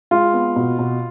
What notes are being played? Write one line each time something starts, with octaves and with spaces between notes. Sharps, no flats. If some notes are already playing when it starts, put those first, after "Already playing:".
G#3 F4
B3
B2
B2